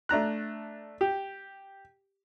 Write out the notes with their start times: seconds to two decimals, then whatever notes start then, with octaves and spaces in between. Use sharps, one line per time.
0.09 A3 D4 A#5 F#6
1.01 G4